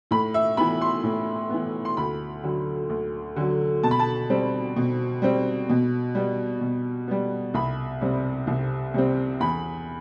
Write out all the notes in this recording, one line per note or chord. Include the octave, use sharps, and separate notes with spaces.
A2 B5
E5
E3 B3 B5
C6
A2
E3 B3
C6
D2 B5
D3 F#3
D2
D3 F#3
B2 A5
B5
A5
G3 C4
B2
G3 C4
B2
G3 B3
B2
G3 B3
C2 B5
C3 G3 C4
C2
C3 G3 C4
E2 B5